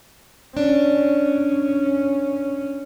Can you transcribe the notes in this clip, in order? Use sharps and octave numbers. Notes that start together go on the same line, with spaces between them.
C#4 D4